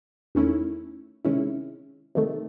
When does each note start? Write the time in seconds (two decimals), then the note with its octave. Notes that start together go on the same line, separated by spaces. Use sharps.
0.35 E2 D#3 A3 C#4 E4
1.25 C3 D#3 G#3 C#4 E4
2.15 C3 D#3 A3